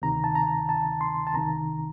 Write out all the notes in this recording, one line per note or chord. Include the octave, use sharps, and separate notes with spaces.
D2 C3 D#3 A#5
A5
A#5
A5
C6
A5
C2 C3 D#3 A#5